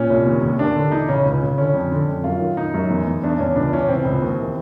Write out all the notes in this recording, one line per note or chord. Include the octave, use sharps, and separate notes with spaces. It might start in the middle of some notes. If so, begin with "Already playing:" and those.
Already playing: A#2 C#4
C2
D#2
D#2
D#2 D4
D3
E3 D#4
C#3 C#4
C#2
C#3
D3 C#4
F2
D3
F2
F#2 F4
D#3
D#3 D#4
F#2
E2
E2
E2 D4
E2 C#4
C#2 D4
E3 C#4
C#2 C4
C#2
D#2
E3